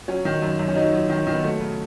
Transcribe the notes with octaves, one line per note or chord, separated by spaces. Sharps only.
F#3 C#4
D#3
F#2
F#2
C#4
F#3 D#4
F#3
D#3
D#3
B3
F#3 A3
C#3